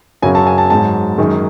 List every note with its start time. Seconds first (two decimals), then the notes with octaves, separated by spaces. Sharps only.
0.22 F#2 C#3 F#3 G#5
0.35 A5
0.47 G#5
0.58 A5
0.70 G#2 F#3 A5
1.18 F#2 D#3 G#3